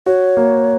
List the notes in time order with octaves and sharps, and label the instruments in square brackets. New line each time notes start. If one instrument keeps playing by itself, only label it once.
[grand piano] F#4 [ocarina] C#5
[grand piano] A#3